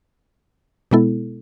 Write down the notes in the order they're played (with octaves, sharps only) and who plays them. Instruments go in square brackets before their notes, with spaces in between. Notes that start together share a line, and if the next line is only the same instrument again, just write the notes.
[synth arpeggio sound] B2 G#3 B3 E4 A4